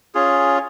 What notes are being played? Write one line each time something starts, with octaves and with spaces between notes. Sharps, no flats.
C#4 F4 G#4